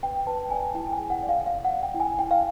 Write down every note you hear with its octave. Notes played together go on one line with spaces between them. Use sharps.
B4 G5
B4 A5
D5 G#5
E4 G5
G#5
G#4
F#5
D5
F5
D5 F5
F#5
D5
G5
E4
G#5
E4 G5
F5